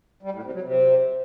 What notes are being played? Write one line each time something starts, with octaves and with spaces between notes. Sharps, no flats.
G3
A2
C3
F#3
C3